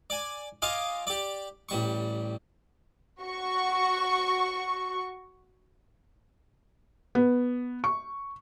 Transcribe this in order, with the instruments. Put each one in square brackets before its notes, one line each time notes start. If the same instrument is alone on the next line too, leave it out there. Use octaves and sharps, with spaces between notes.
[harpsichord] D5 G#5
F4 D#5 F5 G#5 D6
G4 D5
A1 G3 C#6
[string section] F#4 C#6
[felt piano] B3
C#6